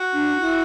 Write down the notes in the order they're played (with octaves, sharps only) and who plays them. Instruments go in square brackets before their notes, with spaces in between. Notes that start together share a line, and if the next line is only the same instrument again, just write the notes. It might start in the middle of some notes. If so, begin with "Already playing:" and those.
Already playing: [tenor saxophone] F#4
[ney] D4
D4
E4